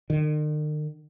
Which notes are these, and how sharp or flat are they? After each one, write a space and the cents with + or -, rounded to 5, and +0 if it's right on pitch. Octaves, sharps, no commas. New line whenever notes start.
D#3 -45